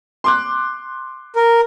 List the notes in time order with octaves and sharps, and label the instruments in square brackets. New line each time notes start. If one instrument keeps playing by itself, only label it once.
[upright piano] C6 D6 F#6
[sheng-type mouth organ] A#4